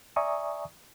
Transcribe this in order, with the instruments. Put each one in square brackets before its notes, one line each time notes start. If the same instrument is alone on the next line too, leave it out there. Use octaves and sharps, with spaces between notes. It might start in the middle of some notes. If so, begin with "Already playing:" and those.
[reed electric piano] D5 E5 G#5 A#5 C#6 D#6